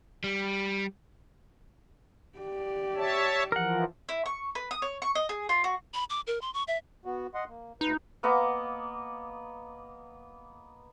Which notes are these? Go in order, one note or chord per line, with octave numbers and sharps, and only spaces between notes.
G3
G4 D5
C#5 E5 A5
E3 F3 A#4 F#5
E4
C#6
B4
D#6
C#5
C#6
D#5
G#4
F4
F#4
B5
D6
A#4
C6
C#6
E5
B3 F#4
D#5 F#5 C6
A#3
D2 D#4 B4
A#3 B3 D#5 D6